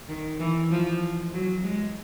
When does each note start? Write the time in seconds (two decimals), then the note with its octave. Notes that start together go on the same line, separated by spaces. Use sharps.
0.08 D#3
0.40 E3
0.71 F3
1.33 F#3
1.64 G#3